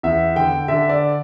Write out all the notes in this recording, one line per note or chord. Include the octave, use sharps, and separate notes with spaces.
E2 E5
D3 G5
D3 E5
D5